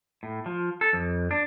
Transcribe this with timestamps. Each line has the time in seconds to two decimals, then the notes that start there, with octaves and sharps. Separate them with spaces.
0.23 A2
0.46 F3
0.81 A4
0.93 F2
1.31 D4